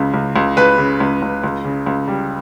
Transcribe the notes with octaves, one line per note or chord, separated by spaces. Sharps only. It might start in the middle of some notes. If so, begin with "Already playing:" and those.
Already playing: C#2 C#3
C#2
C#2
C#2 B4
C#3
C#2
C#2
C#2
C#3
C#2
G3